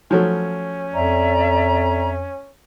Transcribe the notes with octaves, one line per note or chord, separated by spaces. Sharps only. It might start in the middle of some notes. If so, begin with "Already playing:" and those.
F3 F#3 A3 C#4
F2 D5 E5 A#5